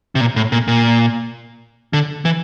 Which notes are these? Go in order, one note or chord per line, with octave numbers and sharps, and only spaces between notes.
C3
A#2
A2
A#2
A#2
D3
E3